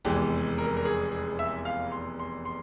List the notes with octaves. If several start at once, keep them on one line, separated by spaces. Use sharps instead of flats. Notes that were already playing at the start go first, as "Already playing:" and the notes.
F1 E2 E3 G#3 G4
A#4
A#4
G#4
G#4
E5
F5
C6
C6
C6